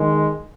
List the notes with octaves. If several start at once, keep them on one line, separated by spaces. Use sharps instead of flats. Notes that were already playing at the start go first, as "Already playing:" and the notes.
Already playing: D#3 G#3